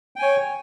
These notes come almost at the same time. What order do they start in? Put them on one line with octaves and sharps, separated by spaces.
G5 G#5 C#5